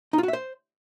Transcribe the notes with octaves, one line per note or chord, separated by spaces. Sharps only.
D#4
F4
F#4
E5
C5